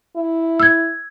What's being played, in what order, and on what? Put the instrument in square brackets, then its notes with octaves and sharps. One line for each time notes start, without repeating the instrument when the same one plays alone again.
[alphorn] E4
[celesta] E6 G#6